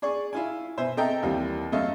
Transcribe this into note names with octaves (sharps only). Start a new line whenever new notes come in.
G#4 D5 G#5 C#6
E4 F4 G#5
B2 C5 E5 G#5
C4 A4 D#5 E5 G5 A#5
D#2 E3 G3 C4
F#2 A3 A4 D#5 F5